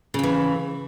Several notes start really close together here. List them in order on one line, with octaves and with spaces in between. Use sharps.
C#3 F2 E3